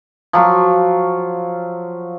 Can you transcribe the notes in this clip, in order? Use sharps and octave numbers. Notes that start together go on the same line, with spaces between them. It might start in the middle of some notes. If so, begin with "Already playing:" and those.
F3 F#3 F5 C#6